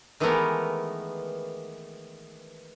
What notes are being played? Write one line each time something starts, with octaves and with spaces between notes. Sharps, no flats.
D#3 E3 G#3 A3 B3 A#4